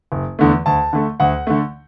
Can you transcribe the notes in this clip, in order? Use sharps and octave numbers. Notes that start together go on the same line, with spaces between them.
F#1
E2 D3 A3
D2 A5
D3 A3
D2 F#5
D3 A3